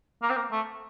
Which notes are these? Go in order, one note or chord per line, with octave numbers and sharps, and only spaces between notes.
A#3
C4
A#3
A3